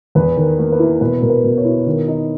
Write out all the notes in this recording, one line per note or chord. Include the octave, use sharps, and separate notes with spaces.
E2 B4
D#3
A#4
A#3
B4
E4
B2 B4
B2 A#4
B4
B2
C#5
E4
D#3
D#4